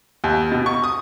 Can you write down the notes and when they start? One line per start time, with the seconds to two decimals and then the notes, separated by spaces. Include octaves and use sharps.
0.24 D#2
0.52 B2
0.66 C#6
0.84 D#6